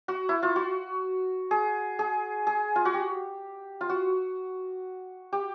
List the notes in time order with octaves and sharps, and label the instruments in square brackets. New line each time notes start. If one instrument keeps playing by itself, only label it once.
[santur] F#4
E4
F4
F#4
G#4
G#4
G#4
F4
F#4
G4
F4
F#4
G4